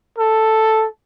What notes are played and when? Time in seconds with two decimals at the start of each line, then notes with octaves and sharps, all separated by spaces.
0.18 A4